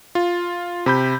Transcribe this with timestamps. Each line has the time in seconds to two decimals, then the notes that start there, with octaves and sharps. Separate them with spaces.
0.15 F4
0.86 C3 B5 G6